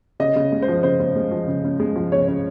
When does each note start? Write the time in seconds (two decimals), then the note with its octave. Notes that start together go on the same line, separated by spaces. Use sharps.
0.20 C#3 D#5
0.36 C#3
0.52 G#3
0.62 C5
0.68 F3
0.83 C#3 C5
0.99 C#3
1.16 G#3
1.31 F3
1.47 C#3
1.64 C#3
1.80 G#3
1.96 F3
2.12 C#3 C#5
2.28 C#3